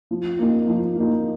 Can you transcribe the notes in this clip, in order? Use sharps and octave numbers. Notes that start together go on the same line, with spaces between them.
F3
A#3 D#4
F3
A#3 D#4